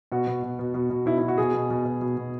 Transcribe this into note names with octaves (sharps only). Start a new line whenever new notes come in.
B2 F#4
B2
B2
B2
B2
B2
B2 E4
E4
B2
F#4
B2 G#4
B2
B2
B2
B2
B2